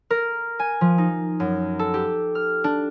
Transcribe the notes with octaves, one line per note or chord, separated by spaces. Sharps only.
A#4
G#5
F3
D#4
F#2
A4
G4
F6
D4